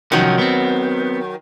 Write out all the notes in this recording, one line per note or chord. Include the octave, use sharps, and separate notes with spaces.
C2 D#3 F3 F#3 C#4
B3 C4